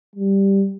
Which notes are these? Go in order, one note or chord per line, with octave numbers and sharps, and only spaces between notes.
G3